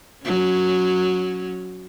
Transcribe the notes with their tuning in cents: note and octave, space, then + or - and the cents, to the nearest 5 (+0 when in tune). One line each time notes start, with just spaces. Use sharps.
F#3 -10 C#4 +0